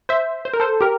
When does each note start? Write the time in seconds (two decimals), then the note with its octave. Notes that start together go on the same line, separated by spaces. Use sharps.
0.09 C5 E5
0.45 C5
0.54 A#4
0.60 A4 C5
0.81 G4 A#4